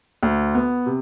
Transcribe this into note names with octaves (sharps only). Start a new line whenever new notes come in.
D2
B3
C3